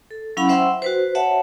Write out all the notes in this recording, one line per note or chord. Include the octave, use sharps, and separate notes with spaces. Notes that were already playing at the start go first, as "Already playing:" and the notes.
A4
F#3 C#4 E4 F5 F#5 B5
C5 E5 F#5 G5 C6 E6
F#4 B4 C5
C#5 E5 F#5 A5